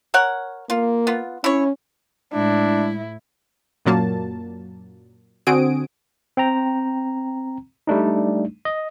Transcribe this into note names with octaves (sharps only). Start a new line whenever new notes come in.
A#4 C#5 F#5
A#3 F4
B3 F4
C#4 E4 C#5
A2 G#3 D4 E4
F#2 A#2 F#3 A#3 A5
D3 C4 F#4 G#5 D#6 D7
C4 G5 A#5
G3 A3 D4 D#4
D#5